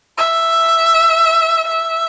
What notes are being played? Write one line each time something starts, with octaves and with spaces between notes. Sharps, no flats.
E5
E5